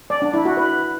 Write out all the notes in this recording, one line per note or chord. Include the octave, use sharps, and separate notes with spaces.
D5
D4
E4
F#4
B4